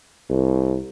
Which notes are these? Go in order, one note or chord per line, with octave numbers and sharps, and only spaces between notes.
C2